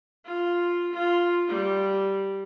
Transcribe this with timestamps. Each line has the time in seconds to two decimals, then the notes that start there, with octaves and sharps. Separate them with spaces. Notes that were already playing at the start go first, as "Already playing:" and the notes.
0.25 F4
0.93 F4
1.47 G3